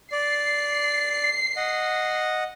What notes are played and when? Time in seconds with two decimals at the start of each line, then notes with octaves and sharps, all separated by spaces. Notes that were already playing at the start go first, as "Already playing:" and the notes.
0.12 D5 C7
1.56 D#5 F#5